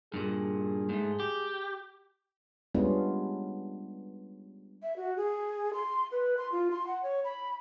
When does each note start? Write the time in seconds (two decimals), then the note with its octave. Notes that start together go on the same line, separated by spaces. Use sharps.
0.14 G2 A#2 G#4
0.89 G#2 A3
1.20 G4
2.75 G3 G#3 B3 C#4 D4 F4
4.83 E5
4.97 F#4
5.17 G#4
5.74 C6
6.12 B4
6.37 C6
6.52 F4
6.71 C6
6.87 F#5
7.03 C#5
7.24 B5